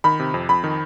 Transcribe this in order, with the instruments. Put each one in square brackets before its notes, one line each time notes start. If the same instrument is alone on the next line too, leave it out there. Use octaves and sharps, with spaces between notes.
[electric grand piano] D#3 [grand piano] B5
[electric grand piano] C3
F2
[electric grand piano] F2 [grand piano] B5
[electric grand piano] D#3